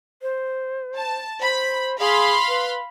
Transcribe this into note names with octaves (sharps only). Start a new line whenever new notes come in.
C5
A5
C5 B5
G#4 F5 B5 C6
B4